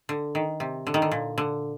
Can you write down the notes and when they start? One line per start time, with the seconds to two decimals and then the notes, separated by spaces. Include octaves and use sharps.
0.09 D3
0.35 D#3
0.60 C3
0.87 D3
0.94 D#3
1.02 D3
1.11 A#2
1.38 D3